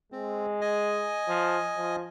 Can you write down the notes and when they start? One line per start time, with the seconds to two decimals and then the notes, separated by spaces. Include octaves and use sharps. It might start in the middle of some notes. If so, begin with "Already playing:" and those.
0.12 G#3 C4
0.61 D#5 G#5
1.28 F3
1.77 F3